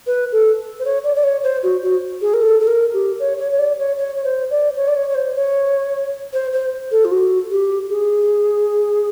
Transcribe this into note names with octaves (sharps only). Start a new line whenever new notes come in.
B4
A4
C5
C#5
D5
D5
C#5
C5
F#4
F#4
G#4
A#4
A4
A4
A#4
G4
C#5
C#5
C#5
D5
C#5
C#5
C#5
C5
D5
C#5
D5
C#5
C#5
C5
C#5
C5
C5
A4
F4
F#4
G4
G#4